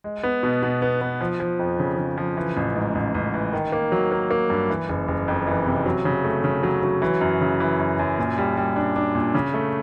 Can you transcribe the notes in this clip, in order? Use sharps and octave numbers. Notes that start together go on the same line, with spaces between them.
G#3
B3
B2
B2
B3
B3
F3
F3
F2
C#3
C#3
F3
E3
A1
G#2
A1
A1
E3
D#3
A#3
F#3
A#3
A#3
G2
E3
F#1
F#1
F2
E3
C3
F#3
C#3
A3
C#3
F#3
F#3
E3
F#2
C#3
E3
F#2
F#2
A#2
G3
G3
D4
D4
A#2
C#3
A3